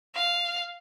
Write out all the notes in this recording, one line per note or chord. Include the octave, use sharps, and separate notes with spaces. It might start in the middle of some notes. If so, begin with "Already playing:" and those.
F5